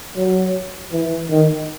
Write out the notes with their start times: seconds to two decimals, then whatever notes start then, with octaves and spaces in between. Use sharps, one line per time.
0.17 F#3
0.92 E3
1.30 D#3